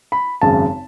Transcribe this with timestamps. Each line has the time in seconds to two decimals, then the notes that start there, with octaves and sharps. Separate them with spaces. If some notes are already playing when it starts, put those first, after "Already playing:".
0.12 B5
0.41 G#1 F#2 C#3 A5